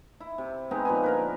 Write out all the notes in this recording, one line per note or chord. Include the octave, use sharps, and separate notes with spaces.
E4
C3
G#3 B3 C4 D#4
A#2 F3 B4 G#5
D3 A#4 B4